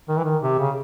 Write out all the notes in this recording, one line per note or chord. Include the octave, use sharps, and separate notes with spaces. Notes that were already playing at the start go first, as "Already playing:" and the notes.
D#3
E3
D#3
C3
C#3